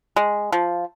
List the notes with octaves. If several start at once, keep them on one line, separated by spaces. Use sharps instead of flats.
G#3
F3